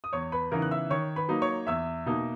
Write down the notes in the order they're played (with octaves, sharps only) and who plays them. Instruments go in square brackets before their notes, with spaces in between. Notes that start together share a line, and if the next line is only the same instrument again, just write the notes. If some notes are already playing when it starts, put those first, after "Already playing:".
[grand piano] D#6
E2 C#5 C#6
B4 B5
C#3 E3 B3 D#4 A#4 A#5
F#6
E5 E6
D#3 C#5 C#6
B4 B5
F#3 A#3 D#4
C#5 C#6
E2 E5 E6
B2 A#3 D#4